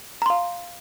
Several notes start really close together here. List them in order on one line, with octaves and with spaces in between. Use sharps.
A#5 C6 F5